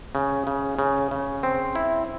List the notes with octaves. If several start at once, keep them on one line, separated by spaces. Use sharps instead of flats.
C#3
C#3
C#3
C#3
C4
E4